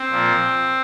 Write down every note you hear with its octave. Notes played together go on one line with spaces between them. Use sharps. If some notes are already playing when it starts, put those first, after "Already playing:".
Already playing: C4
A#2 F3